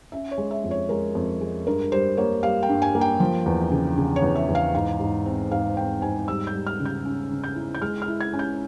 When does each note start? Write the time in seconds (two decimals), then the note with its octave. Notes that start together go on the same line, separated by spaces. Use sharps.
0.12 C#4 E5
0.31 C#5
0.38 G#3
0.51 E5
0.64 F2
0.71 C#5
0.89 G#3 A#4
1.15 F2
1.41 G#3
1.67 G2 A#4
1.92 G3 C5
2.17 A#3 C#5
2.43 G3 F5
2.63 G5
2.69 G2
2.82 G#5
2.95 A#3
3.01 G5
3.20 F3
3.46 E2
3.72 C#3
3.98 C#3
4.16 C#5
4.22 E2
4.35 E5
4.49 E2
4.55 F5
4.75 G#2 F5
5.00 G#2
5.26 C4
5.51 G#2 F5
5.77 C4 G5
6.02 G#2 G#5
6.28 G3 E6
6.47 G6
6.53 G3
6.67 F6
6.80 C#3
6.86 G6
7.05 C#4
7.31 C#3
7.44 G6
7.56 E4
7.75 G6
7.82 G#3 F6
8.02 F6
8.08 E4
8.21 G#6
8.33 C#4
8.39 G6